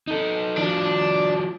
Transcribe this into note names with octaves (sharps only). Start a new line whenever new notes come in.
D#4 A4
F3 D4 F4 F#4